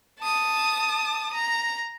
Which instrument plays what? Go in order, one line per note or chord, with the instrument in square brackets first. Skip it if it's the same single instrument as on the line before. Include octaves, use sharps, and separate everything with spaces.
[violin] A5 D#6
A#5